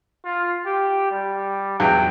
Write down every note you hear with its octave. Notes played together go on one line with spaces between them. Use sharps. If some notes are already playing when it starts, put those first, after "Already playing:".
F4
G4
G3
E2 F#3 G5